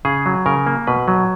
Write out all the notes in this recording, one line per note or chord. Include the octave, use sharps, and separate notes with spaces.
C#3 G#4
F#3
C#3 A#4
A#3
B2 B4
F#3